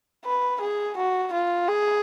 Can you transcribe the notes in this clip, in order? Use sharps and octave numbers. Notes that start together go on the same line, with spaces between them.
B4
G#4
F#4
F4
G#4